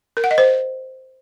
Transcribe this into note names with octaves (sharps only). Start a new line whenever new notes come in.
A#4
F#5
D#5
C5